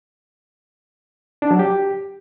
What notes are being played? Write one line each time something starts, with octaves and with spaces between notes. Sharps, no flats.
D4
F#3
G4